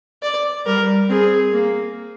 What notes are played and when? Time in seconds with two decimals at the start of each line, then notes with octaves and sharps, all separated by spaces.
0.22 D5
0.66 G3 A#4
1.09 C4 G#4
1.53 A#3